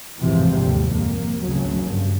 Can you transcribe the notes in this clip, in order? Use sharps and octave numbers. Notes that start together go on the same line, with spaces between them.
A1 F2 G#2 C3 E3 F3
D#2 G#2 D3 G3
F2 A#3
G#1 D2 C#3 F#3
G2